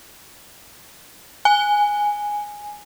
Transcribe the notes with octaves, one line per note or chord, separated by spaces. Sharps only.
G#5